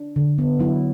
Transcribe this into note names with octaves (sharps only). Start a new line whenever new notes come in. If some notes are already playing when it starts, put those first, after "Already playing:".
Already playing: D4
D3
B3
F#3 E4